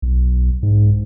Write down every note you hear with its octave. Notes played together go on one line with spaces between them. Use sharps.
B1
G#2